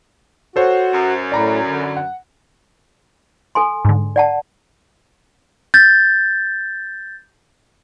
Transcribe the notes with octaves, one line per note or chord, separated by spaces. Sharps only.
F#4 A4 C5 C#5
F#2
A2 D5 A#5 B5
D3
F#5
A4 G#5 C6
G#2 D3
D5 F#5 A5
G6 A6